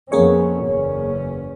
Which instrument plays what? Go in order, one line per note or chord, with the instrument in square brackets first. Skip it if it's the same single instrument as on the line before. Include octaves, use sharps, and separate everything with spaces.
[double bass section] F2 B3 C#4 [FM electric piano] A#3 G#4 C#5
[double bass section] F#1 E2 C#4